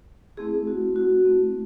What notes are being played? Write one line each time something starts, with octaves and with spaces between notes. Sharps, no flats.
A3 C4 E4 G#4
F#4
F#4
A3 C4 E4